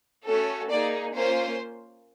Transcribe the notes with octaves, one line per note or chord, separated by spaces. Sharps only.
A3 C#4 F#4 A4
A#3 D#4 G#4 D5
A#3 C#4 F4 C5